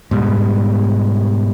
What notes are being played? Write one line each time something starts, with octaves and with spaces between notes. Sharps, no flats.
G#2 B2 G3